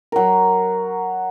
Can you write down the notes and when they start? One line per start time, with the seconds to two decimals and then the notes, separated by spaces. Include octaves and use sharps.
0.12 F#3 A#4